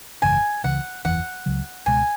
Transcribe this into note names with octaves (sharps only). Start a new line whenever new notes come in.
G#1 F#2 C#3 E3 G#5
C#2 C#3 E3 F#5
F#1 E2 E3 F#5
C#2 C#3 F#3
C#2 B2 G#3 G#5